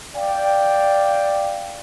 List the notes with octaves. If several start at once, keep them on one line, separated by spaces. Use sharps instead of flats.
D5 F5 G5